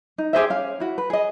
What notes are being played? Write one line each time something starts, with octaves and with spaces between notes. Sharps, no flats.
D#4
G4 G#4 C5 E5
C#4 F5
E4 F#4
B4
G#4 D#5